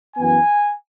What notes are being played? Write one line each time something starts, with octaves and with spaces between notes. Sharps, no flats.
F#2 E3 B3 G#5